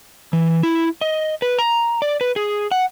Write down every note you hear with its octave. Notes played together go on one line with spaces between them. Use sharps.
E3
E4
D#5
B4
A#5
D5
B4
G#4
F#5